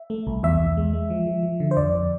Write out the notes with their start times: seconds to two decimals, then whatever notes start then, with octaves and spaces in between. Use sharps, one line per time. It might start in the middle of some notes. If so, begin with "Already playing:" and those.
Already playing: E5
0.10 A3
0.27 C2
0.43 E2 E5
0.60 E2
0.77 G#3
0.93 G#3
1.10 F3
1.27 F3
1.43 F3
1.60 D3
1.71 C5
1.77 F2 D5
1.93 F2